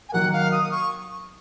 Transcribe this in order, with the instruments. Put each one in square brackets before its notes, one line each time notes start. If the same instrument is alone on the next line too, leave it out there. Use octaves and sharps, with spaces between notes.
[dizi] G#5
[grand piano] D#3 F#3 A#3 [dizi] F#5
[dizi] F5
D#6
C#6